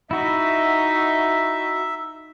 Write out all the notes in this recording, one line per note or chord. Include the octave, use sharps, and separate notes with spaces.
D#4 E4 F#4 E5